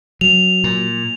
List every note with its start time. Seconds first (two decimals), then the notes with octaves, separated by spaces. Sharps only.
0.21 F#3 F7
0.64 A#2